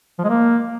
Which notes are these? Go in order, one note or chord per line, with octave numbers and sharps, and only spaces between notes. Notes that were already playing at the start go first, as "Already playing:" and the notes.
F3
G#3
A#3